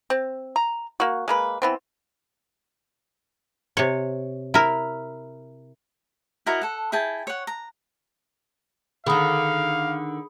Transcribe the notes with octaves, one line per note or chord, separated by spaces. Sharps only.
C4
A#5
A#3 F#4
G#3 A#3 B4
E3 B3 C4
C3 C#5
E4 A#4
E4 F#4 A#4 D#5
A4 F#5
E4 G#4 G5 A5
C#5 F#5
A#5
D3 D#3 G#4 F5 B5 D#6